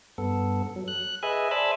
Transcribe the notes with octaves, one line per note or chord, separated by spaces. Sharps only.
G2 B3 A4
F#3
F#6
G#4 B4 D#5 E5 G#5
C5 D5 E5 G#5 A5 B5